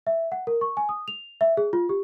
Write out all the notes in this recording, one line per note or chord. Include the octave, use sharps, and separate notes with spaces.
E5
F#5
A#4
C#6
G#5
D#6
F7
E5
G#4
F4
G4